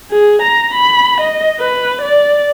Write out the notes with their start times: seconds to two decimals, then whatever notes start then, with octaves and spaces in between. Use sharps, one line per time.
0.11 G#4
0.42 A#5
0.74 B5
1.21 D#5
1.60 B4
2.02 D5